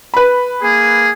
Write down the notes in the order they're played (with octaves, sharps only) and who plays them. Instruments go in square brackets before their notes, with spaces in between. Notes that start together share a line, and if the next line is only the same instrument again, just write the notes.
[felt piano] B4 B5
[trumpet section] A#3 G#4